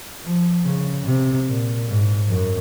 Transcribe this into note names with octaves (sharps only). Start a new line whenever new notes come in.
F3
C#3
C3
A#2
G#2
F#2